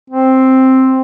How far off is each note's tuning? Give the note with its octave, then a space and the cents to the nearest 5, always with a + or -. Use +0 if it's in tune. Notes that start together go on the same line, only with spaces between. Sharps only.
C4 +5